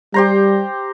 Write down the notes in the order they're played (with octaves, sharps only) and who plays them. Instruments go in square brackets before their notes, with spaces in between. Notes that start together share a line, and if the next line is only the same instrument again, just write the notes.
[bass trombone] G3 [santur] G4 C5 A#5